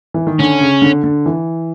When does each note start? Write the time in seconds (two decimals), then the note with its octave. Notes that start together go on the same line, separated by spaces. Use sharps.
0.14 E3
0.27 D#3
0.39 D3 C#4
0.60 C#3
0.82 D3
1.04 D3
1.26 E3